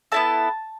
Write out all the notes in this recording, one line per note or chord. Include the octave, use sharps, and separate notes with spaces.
B3 E4 A4 A5